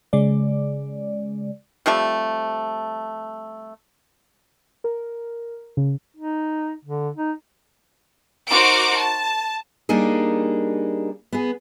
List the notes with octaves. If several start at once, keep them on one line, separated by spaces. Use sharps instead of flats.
C#3 G#3 D5
C3 F3 G3 A3
A#4
C#3
D#4
D3
D#4
D#4 F#4 A#4 C5 D6 D7
A5
G3 A#3 D4 D#4 G#4
B3 G#4